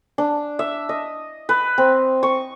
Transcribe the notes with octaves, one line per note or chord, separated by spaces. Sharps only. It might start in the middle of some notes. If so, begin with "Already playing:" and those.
D4
E5
D#5
B4
C4
C#6